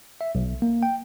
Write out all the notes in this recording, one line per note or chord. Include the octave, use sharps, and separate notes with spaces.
E5
B1
A#3
G5